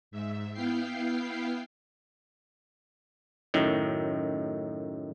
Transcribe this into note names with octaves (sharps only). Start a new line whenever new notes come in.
G#2 E5
B3 E4 F5 G5 C7
F#2 A2 D#3